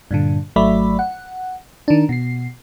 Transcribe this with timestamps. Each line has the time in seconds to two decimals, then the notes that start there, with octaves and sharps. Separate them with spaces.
0.11 G2 A#2 D3
0.56 G#1 F#3 A3 D5 E5 B5
0.99 F#5
1.88 D#3 D4
2.09 B2 C7